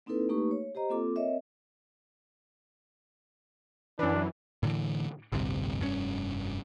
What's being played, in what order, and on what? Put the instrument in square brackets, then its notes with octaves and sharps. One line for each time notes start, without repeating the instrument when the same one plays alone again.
[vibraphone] A#3 C4 D#4 E4 A4 B4
A3 A#3 D#4 G4 B4 C#6
C#5
G4 C5 D#5 A#5
A#3 C4 F4 A4 D6
C4 A#4 C#5 D#5 E5
[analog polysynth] F#2 E3 [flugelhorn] D4
[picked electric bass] A2 D3 E3
A1 D2 G2 C3
F1 G2 B2 C#4